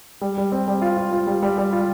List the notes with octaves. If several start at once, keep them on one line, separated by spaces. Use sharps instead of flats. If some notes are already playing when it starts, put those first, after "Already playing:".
G3
G3
C4
G3
F4
F4
F4
G3
G3
G3
F4